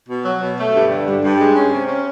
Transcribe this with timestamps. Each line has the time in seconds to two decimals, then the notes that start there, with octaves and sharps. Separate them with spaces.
0.09 B2
0.25 F#3
0.41 B2
0.58 A3
0.75 G2
0.90 D3
1.07 G2
1.24 G2
1.39 G#3
1.56 C#4
1.73 C3
1.89 C#4